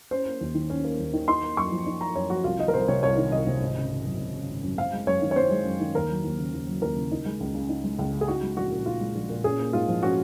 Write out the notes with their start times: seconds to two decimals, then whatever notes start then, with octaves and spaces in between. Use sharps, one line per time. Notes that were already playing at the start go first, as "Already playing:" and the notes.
0.11 C#4 C5
0.26 A#3
0.41 D#2
0.55 D#3
0.70 C#4
0.84 A#3
0.99 D#2
1.13 D#3
1.28 D#4 C6
1.43 A#3
1.57 F#2 C#6
1.72 F3
1.87 D#4
2.01 A#3 A#5
2.15 F#2 C#5
2.30 F3 F#4
2.44 C2 F4
2.59 D#3 D#5
2.68 A#4
2.74 C2 C5
2.88 C3 C#5
3.03 C2 C#5
3.18 D#3
3.32 C2 D#5
3.47 C3
3.61 G#1
3.76 C#3
3.90 G#1
4.05 F#2
4.19 G#1
4.34 C#3
4.49 G#1
4.63 F#2
4.78 C4 F5
4.93 G#3
5.07 F#2 C#5
5.22 D#3
5.31 C#5
5.36 C4 C5
5.51 G#3
5.65 F#2
5.80 D#3
5.95 D#2 A#4
6.09 F#3
6.24 D#2
6.39 C#3
6.53 D#2
6.67 F#3
6.82 D#2 A#4
6.96 C#3
7.12 D#4
7.26 G#3
7.40 C#2
7.55 C#3
7.69 D#4
7.84 G#3
7.99 C#2
8.13 C#3
8.21 G#4
8.28 D#4 F#4
8.42 G#3
8.57 A#1 F#4
8.71 A#2
8.86 D#4 F4
9.00 G#3
9.15 A#1
9.30 A#2
9.44 C#4 G#4
9.59 A#3
9.73 G#2 F4
9.88 F3
10.02 C#4 F#4